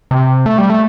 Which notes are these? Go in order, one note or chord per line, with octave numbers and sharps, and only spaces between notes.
C3
A3
G3
A3